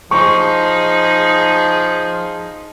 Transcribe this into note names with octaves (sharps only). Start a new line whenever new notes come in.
F3 D#4 G#4 C#6